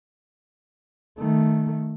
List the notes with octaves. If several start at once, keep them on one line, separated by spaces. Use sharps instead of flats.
D#3 A3